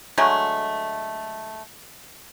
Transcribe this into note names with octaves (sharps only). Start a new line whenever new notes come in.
D3 F#3 G#3 A3